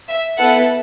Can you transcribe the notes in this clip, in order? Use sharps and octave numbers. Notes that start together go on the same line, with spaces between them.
E5
B3 E4 A4 F#5